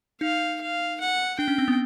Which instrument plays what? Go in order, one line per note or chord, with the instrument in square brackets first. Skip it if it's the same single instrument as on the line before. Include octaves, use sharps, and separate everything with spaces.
[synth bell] D#4 [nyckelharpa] F5
[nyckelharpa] F5
F#5
[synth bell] D4 [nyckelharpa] G5
[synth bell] C#4
C4
B3